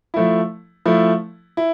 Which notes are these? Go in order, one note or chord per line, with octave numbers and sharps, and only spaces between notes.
F3 A3 E4
F3 A3 E4
E4